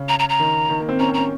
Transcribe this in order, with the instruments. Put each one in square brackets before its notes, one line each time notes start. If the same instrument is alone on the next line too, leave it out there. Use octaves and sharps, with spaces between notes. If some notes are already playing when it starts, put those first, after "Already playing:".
Already playing: [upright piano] C#3
[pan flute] A#5
A#5
A#5
[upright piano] D#3
D#3
A#3
C4
[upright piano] C#4 [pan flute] A#5
[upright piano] C4
[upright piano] C#4 [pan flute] A#5